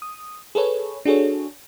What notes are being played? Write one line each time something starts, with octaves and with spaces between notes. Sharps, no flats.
D#6
G#4 A4 B4 C#5
D4 F#4 G#4 A4 C#5